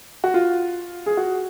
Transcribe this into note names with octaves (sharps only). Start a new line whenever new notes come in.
F#4
F4
G#4
F#4